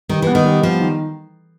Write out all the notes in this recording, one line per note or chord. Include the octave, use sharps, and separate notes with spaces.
D#3 G3
E3 B3
D#3
G3
F3 B3
D#3